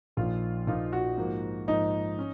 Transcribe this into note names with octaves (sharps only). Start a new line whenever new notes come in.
A#1 A#2 F3 A#3 D#4 F4
A#1 A#2 F3 A#3 D#4 F4
F#4
G#2 F3 A#3
G#2 F3 A#3 D#4
C#4